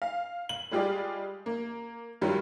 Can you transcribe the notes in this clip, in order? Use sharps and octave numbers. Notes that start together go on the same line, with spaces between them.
F5
F#7
G3 G#3 F4 G4 G#4 D5
A#3
G2 D#3 F#3 G3 F4